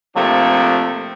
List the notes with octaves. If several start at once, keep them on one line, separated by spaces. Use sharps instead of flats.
C3 F3 A3 A#3 D4